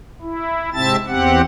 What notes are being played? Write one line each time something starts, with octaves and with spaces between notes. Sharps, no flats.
E4
G#2 C3 C4 E5 A5 A6
E2 C4 G4 F#5